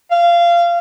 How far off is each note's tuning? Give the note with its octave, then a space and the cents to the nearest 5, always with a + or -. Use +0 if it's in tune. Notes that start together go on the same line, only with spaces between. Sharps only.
F5 -20